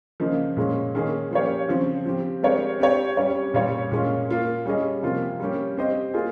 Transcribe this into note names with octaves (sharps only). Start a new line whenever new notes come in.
C#3 F3 A#3 D#4
A#2 G#3 C#4
D#3 A#3 C#4 G#4
F3 A#3 C#4 G4 C#5
C#3 F3 C4
F3 C4 G4
G#3 C4 G4 A#4 C#5
C4 G4 C#5
G3 C#4 G4 C#5
A#2 G3 C#4 G4 C#5
A#2 G#3 C#4 F4
A#3 F4 A#4
G3 C#4 G#4 D#5
C3 F3 A#3 F4
G3 A#3 C#4 G4
C4 G4 C5 D#5
A#3 F4 G#4